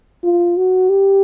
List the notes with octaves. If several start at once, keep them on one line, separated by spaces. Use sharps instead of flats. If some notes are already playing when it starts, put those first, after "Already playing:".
F4
F#4
G4